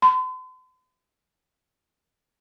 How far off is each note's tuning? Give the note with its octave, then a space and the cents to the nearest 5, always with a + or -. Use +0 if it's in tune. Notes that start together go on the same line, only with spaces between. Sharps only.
C6 -45